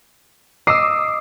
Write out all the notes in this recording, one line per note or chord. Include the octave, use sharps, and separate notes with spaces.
D#5 D6 E6 C7